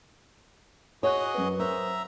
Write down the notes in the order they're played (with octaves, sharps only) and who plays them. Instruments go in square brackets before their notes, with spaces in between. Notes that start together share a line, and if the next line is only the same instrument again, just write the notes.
[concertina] F#4 G#4 D#5 [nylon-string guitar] C#5 [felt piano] D#6 F#6
[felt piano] F#2 B4
[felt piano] A#4 [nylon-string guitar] C5 [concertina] E5 A#5